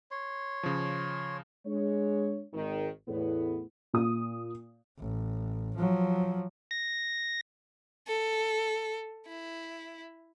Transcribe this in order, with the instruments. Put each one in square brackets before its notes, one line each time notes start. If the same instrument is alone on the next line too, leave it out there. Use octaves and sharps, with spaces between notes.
[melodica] C#5 C6
[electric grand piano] C#3 F3
[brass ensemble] G#3 D4 C#5
G#1 D#3
E2 A2 B3
[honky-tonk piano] A#2 D#6
[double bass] A1
F3 F#3
[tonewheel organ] A#6
[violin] A4
E4